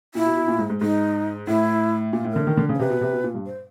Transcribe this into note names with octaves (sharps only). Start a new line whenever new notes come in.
A#2 E4
B2
B2
A#2
G#2
G#2
G#2 D#4
A2 E4
A#2 F4
A2
A#4
D3
D#3
D3
C#3
C5
C3 B4
B2
C3
B2
A#2
G2
C5